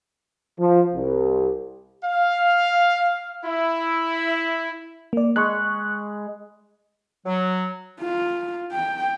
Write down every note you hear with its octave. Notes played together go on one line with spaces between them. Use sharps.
F3
C2
F5
E4
A#3 D5
G#3 B5 C#6 F#6
F#3
F4
G5